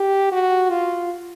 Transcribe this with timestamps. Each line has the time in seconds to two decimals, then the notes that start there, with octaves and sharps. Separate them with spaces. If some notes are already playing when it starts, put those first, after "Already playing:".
Already playing: G4
0.32 F#4
0.71 F4